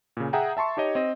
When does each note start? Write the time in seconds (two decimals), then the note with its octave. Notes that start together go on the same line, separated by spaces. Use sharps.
0.17 A#2 C#3
0.33 G#4 E5 F#5 G5 A#5
0.57 E5 A5 C6 C#6
0.77 D#4 G4 C#5 D#5
0.95 C4 D#5